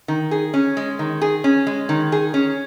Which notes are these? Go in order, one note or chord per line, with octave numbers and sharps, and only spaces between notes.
D#3
G#4
C#4
G#3
D#3
G#4
C#4
G#3
D#3
G#4
C#4